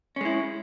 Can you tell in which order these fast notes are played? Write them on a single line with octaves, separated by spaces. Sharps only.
C#4 G#3 E4